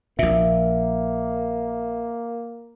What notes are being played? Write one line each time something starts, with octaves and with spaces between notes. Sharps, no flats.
A#1 A#2 A#3 E5